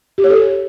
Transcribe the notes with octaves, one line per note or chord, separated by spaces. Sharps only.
G4
C#5
A4